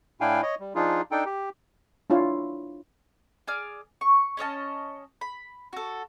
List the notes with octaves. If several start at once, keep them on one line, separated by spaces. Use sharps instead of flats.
A2 D4 E4 F5 G5 G#5
C#5 D#5
G3
F3 D4 D#4 F4 G#4
D4 D#4 A4 G5
G4
D4 E4 F4 C#5
G#4 D5 F6
C#6
C#4 C#5 D#5 A5
B5
F#4 A4